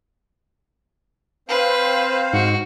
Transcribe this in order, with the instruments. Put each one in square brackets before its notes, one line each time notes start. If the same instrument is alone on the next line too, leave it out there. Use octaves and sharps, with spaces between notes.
[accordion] C4 C5 F5 [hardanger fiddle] B4
[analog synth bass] G#2 [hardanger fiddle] F#4